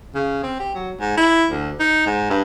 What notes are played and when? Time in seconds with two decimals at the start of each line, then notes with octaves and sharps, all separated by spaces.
0.15 C#3
0.43 C4
0.60 G4
0.74 F#3
1.00 G#2
1.17 E4
1.51 D2
1.80 D#4
2.06 G#2
2.30 G2